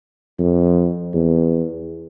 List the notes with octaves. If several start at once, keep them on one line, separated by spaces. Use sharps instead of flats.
F2
E2